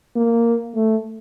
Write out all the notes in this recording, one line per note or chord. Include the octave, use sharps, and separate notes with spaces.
A#3
A3